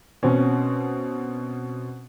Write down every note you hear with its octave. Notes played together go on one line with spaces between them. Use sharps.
B2 C4 C#4